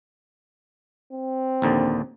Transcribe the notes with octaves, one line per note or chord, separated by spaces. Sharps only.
C4
A#1 D#2 D3